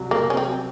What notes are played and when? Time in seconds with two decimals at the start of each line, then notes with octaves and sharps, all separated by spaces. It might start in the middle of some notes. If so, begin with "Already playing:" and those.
Already playing: C2 F#3
0.11 C2 A#3
0.30 C#4
0.37 F#3 C4